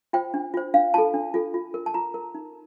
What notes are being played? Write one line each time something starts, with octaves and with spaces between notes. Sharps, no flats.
F4 C5 G5
D4
F4 C5
D4 F5
F4 A4 A5
D4
F4 A4
F4
A#4
A5
F4 A#5
A#4
D#4